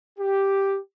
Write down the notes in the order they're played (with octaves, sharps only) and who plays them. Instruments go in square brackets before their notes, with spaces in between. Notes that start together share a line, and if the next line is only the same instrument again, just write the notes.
[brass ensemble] G4